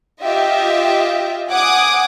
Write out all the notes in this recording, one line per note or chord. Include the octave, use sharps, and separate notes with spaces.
F4 G4 D#5 E5
F#5 G#5 D6 D#6